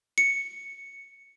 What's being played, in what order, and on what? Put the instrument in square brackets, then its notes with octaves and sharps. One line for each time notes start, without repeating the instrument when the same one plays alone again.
[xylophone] C#7